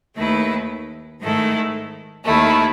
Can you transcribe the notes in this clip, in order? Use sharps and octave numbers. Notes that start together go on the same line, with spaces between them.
D#2 D#3 A3 E4 B4
G#2 D#3 A3 E4 A4
D#2 D#3 A3 E4